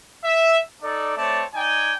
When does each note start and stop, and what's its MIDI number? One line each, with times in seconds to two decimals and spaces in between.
0.24 0.61 76
0.83 1.16 63
0.83 1.16 69
0.83 1.16 74
1.17 1.44 57
1.17 1.44 60
1.17 1.44 73
1.17 1.44 74
1.17 1.44 81
1.55 1.94 63
1.55 1.94 74
1.55 1.94 79
1.55 1.94 80